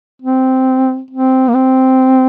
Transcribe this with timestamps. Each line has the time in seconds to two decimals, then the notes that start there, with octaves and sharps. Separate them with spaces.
0.22 C4
1.11 C4
1.48 A#3
1.54 C4